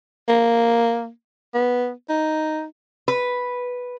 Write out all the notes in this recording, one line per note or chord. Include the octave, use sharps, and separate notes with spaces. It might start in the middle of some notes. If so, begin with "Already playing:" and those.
A#3
B3
D#4
B4